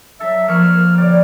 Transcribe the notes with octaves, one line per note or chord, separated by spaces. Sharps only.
F#3 A4 E5
F3 A#3 C#6 F6
D3 C#5 D5 G5